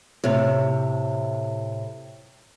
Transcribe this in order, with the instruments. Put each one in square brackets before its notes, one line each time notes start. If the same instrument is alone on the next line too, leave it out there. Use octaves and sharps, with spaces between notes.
[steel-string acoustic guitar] A2 C3